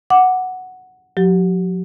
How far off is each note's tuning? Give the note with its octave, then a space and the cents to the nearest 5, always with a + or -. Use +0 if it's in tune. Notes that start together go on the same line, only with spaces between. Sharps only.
F#5 +0 D6 +0
F#3 -45 G4 -30